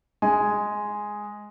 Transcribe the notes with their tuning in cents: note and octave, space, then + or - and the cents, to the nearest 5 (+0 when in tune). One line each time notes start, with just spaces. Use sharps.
G#3 +0 G#5 +0